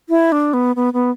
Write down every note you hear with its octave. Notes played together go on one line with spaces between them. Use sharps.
E4
D4
B3
B3
B3